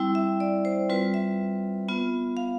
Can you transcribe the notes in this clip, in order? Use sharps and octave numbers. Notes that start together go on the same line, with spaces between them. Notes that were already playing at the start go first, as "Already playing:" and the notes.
Already playing: G3 C4 E4 G5
E5
D5
C5
G3 C4 F4 B4
E5
B3 F4
F5